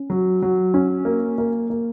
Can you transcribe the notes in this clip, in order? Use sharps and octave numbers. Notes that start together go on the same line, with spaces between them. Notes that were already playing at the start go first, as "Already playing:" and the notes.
Already playing: C#4
F#3
F#3
C#4
A#3
A#3
A#3